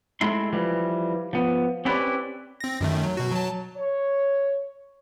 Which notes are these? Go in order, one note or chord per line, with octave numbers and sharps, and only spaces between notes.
G#3 A3 C4 E4 C6
E3 F3 G3
F3 B3
C4 C#4 E4 G4 B4 D5
C4 A#6
F#2 D#3 A3
F#3
B2 F#4
F#3 A5
C#5